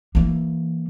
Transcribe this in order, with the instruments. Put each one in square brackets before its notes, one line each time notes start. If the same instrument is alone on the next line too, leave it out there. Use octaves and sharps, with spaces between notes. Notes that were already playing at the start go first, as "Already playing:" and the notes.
[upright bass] E3 A#3